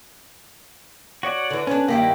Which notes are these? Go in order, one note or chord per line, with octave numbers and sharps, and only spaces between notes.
F#4 C#5 D5
D3 E3
B3 C#4 D4
G2 D#3 A#3 E4 G4